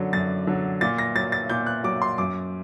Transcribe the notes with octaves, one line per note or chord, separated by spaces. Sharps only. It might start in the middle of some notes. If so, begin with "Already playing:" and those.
Already playing: F#2 D3 F#3
F#2 A6
D3 F#3
A#2 A6
A#6
F#3 A6
A6
A#2 G6
F#6
F#3 D6
C6
F#2 D6